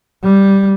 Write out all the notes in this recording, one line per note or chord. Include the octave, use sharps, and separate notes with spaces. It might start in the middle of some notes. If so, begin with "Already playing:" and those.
G3